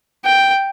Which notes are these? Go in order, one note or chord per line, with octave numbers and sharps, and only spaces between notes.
G5